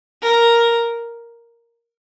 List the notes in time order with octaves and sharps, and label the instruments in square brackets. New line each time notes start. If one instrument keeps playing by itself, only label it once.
[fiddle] A#4